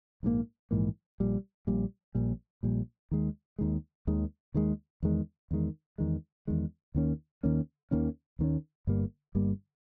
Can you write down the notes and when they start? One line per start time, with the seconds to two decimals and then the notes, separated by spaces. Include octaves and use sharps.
0.23 A#1 G#2 E3 A#3
0.71 A#1 G#2 E3 A#3
1.20 A#1 A#2 G3
1.67 A#1 A#2 G3
2.15 A#1 A#2 G3
2.63 A#1 A#2 G3
3.11 D#2 D#3 G#3
3.59 D#2 D#3 G#3
4.07 D#2 D#3 G#3
4.54 D#2 D#3 G#3
5.03 E2 D#3 G#3
5.51 E2 D#3 G#3
5.98 E2 D#3 G#3
6.47 E2 D#3 G#3
6.95 D#2 D#3 A#3 C#4
7.43 D#2 D#3 A#3 C#4
7.91 D#2 D#3 A#3 C#4
8.39 D#2 D#3 A#3 C#4
8.87 G1 G2 G3 A#3
9.35 G1 G2 G3 A#3